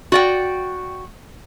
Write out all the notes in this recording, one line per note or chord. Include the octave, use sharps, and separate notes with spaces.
F#4 D5 G5